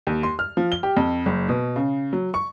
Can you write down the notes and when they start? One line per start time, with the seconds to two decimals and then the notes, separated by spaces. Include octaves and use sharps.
0.07 D#2
0.23 C6
0.39 F6
0.57 F3
0.72 G7
0.83 G4
0.97 F2
1.26 F#1
1.49 B2
1.76 C#3
2.13 F#3
2.34 C#6